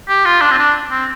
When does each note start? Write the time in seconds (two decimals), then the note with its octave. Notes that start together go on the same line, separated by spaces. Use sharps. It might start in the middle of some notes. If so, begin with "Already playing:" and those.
0.08 G4
0.25 F4
0.41 D4
0.51 C4
0.58 D4
0.91 C4